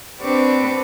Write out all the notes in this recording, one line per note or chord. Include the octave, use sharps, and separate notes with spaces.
C4 D4 G4 B4 C#6 D6